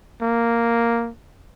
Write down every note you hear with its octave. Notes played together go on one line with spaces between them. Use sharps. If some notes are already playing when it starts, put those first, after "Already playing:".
A#3